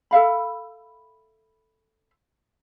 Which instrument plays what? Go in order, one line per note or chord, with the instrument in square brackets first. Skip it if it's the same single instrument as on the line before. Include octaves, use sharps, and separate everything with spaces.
[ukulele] A4 E5 F5 B5